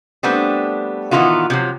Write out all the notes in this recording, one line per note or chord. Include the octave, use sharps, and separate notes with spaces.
G3 A3 B3 C4 D4
A#2 D#3 E3 B3 F4 F#4
C3 F3 F#3